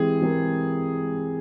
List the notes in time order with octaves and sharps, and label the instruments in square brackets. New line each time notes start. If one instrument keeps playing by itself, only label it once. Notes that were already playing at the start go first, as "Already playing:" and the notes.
Already playing: [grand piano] E3 G#3 C4 G4 [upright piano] G#4
[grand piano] E3 G#3 C4 G4 A#4